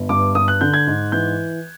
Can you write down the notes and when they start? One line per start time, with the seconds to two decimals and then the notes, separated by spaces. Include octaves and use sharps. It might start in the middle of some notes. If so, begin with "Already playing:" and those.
Already playing: G1
0.09 G2 D6
0.35 G2 D#6
0.48 F#6
0.61 D3 G6
0.74 G#6
0.87 G#2
1.12 E3 G6